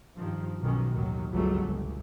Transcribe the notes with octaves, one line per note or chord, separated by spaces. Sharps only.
G2 D#3 F3
B1 B2 D#3 C#4
A1 D#2 D#3 F#3
G1 C#2 B2 F#3 G3 A3
C#2